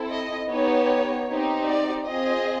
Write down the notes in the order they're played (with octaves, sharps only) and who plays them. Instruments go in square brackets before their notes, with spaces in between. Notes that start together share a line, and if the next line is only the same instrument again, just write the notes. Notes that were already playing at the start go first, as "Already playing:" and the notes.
Already playing: [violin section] C4 E4 A4
D#5
B3 D#4 G4 C#5
C4 D#4 G4
D5
C4 F4 G#4 D#5